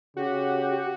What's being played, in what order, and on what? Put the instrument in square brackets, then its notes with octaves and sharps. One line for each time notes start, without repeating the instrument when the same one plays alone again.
[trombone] C#3 [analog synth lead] F#4 [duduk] G4